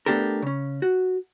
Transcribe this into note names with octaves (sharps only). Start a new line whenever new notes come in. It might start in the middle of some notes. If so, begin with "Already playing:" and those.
A3 B3 D4 G4 A4 A#4
C#3 C#4
F#4